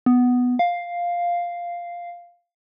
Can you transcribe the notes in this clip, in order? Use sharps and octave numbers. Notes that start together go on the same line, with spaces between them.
B3
F5